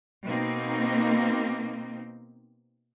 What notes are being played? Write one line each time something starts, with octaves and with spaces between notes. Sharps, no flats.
B2 A#3 C4 D#4